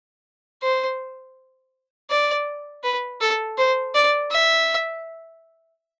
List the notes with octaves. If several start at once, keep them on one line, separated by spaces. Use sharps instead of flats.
C5
D5
B4
A4
C5
D5
E5